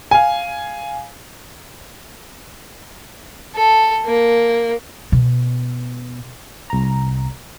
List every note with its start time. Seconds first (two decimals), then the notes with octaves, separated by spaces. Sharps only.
0.11 F5 G#5
3.55 A4
4.05 A#3
5.12 B2
6.70 C2 A#5